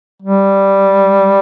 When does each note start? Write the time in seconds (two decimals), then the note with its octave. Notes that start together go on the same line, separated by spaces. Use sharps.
0.22 G3